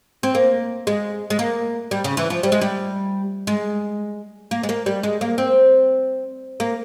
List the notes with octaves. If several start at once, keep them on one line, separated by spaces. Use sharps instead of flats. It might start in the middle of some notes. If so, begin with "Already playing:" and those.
C4
A#3
G#3
G#3
A#3
G3
C#3
E3
F3
G3
G#3
G3
G#3
A#3
G#3
A#3
G3
G#3
A#3
C4
A#3